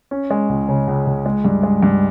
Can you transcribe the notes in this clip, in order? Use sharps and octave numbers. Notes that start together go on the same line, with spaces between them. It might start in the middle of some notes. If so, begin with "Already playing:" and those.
C#4
G#3
C#2
C#3
C#2
C#2
G#3
G2
G#3
G2